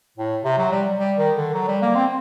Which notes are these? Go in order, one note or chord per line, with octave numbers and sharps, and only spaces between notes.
A2
C3
F#3
G3
G3
D#3
D3
F#3
G3
A#3
C4